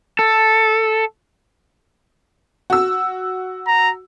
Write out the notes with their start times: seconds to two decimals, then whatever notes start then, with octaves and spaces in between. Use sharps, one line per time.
0.19 A4
2.70 F#4 E6
3.67 A#5